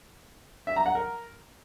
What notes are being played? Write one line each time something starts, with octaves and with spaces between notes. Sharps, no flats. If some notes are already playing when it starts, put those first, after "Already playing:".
E5
A#5
F#5
A#4